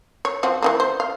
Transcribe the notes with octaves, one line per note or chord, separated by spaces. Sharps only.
C#5
F3 C4 F#4
E3 F3 A#3
C5
F5